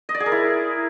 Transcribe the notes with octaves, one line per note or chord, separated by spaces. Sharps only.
D#5
D5
G#4
A#4
E4